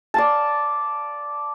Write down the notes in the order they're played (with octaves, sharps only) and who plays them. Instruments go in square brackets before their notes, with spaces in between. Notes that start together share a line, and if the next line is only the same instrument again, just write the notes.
[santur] D5 F5 A5